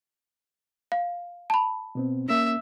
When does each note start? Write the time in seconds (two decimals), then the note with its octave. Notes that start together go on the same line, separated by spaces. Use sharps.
0.92 F5
1.50 A5 B5
1.95 B2 B3 C4
2.29 A#3 C#4 E5